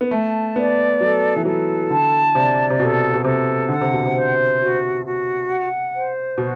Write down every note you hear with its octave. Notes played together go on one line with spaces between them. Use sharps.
B3
A3 A5
B3 D5
F#3 A4
E3
F#3 A4
D3 A5
C3 D5
C3
B2 A4
B2
C3 A4
D3 F#5
C3
B2
C3
C5
F#4
F#4
F#5
C5
B2 F#4